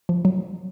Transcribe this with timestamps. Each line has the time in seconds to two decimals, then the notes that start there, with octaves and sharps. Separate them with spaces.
0.09 F3
0.25 F#3